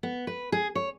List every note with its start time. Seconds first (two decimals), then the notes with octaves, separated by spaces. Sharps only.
0.03 B3
0.27 B4
0.52 G#4
0.75 C#5